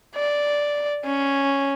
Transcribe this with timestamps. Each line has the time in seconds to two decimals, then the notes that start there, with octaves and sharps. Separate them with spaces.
0.15 D5
1.05 C#4